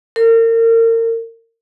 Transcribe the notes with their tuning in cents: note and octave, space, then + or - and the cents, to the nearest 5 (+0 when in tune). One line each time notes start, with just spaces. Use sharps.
A#4 -35